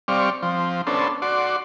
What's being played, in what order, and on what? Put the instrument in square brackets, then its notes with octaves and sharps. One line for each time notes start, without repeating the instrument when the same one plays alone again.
[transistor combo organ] G3 C4 D5 F5 C#6
F3 C4
B3 C#4 D4 A4 C5
F#4 D5 C6